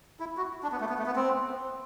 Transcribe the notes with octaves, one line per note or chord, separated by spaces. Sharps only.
E4
F#4
D4
B3
A3
B3
A3
B3
C4